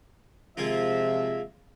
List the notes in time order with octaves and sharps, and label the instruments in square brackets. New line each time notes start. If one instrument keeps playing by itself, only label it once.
[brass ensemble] C3 F3 E5 [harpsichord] G#3 A#3 F4